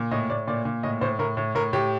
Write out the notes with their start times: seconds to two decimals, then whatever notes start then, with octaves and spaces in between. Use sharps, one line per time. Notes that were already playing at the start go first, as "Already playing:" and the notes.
Already playing: A#2
0.11 A2 D#5
0.29 A2 D5
0.48 A#2 D5
0.65 A#2
0.83 A2 D#5
1.01 A2 C5
1.19 A2 A#4
1.37 A2
1.55 A2 A#4
1.73 A2 G4